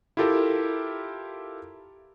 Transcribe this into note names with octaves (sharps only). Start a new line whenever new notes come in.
E4 F4 G4 A4 A#4 E5